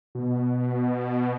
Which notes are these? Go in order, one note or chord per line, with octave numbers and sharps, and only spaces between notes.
B2